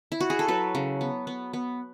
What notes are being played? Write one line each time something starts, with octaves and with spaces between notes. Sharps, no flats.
E4
F#4
G#4
A4
F#3 B4
C#3
B3
B3
B3